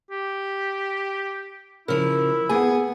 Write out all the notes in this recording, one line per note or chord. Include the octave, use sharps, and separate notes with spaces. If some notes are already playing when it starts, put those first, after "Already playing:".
G4
C#3 F3 E4 A#4
B3 G#4 G#5